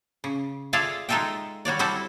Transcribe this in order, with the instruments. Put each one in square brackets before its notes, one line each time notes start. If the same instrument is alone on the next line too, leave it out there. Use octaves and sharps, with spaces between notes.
[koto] C#3
F4 G#4 A4 D5 E5 F5
G#3 D#4 F4 A4 E5 G5
G3 F#4 C#5 D5
G3 C4 E4 F#4 A4